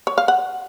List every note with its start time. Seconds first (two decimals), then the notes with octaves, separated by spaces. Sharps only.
0.07 C#5
0.18 F5
0.28 F#5